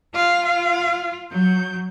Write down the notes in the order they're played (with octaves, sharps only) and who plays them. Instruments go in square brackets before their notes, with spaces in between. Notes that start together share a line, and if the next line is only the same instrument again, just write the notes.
[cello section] F4 [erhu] F5
[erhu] F5
[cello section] F#3 [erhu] G6